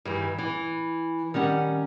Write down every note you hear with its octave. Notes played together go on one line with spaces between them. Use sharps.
G2 D#3 E3
E3
D#3 G3 C#4 F#5